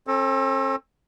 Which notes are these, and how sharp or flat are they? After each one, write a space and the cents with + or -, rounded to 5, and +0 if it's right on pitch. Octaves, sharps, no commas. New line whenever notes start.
C4 +45 A4 +0